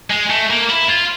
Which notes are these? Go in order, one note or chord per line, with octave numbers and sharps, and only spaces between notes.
G#3
A3
A#3
E4
F4